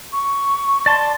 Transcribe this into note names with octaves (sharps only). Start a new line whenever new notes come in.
C#6
D5 A5 C6